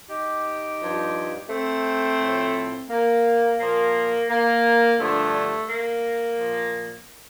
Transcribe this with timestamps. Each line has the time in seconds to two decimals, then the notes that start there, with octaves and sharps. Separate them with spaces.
0.10 D#4 G4
0.81 G2 F3
1.49 A3 C4
2.19 A2 F3
2.90 A#3
3.59 A#2 F3 A#3
4.30 A#3
4.99 G2 D3 F3 A3
5.69 A#3
6.39 A#2 F3